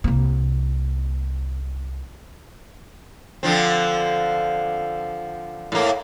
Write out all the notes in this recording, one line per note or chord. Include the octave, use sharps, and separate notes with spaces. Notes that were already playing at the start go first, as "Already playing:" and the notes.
C2 A#3
D3 F3 C4
A2 A#3